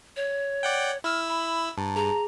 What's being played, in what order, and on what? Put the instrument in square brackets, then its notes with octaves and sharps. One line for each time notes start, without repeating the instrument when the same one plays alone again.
[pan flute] C#5
[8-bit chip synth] D5 F#5 G5
[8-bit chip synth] E4 E6 [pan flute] F6
[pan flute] B5
[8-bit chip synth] G2 [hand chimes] A5 A#5
[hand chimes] G#4 [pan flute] A#5